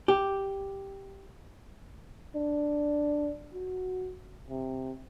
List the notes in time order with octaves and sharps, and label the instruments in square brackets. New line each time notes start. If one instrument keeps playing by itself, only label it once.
[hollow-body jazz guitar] G4
[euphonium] D4
F#4
C3